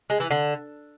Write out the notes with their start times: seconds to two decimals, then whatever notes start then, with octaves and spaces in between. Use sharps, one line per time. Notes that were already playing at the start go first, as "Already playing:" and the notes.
0.10 G#3
0.20 E3
0.31 D3